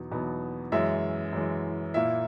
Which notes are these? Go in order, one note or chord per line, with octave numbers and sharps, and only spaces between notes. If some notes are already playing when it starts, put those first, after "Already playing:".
Already playing: E2 B2 F#3 B3 D#4
E2 B2 F#3 B3 D#4
F#2 E3 G#3 E5
F#2 E3 G#3
A#2 A#3 E4 E5